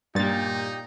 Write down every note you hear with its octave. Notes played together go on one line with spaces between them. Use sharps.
G2 A#2 A#3 D#4 G4 A6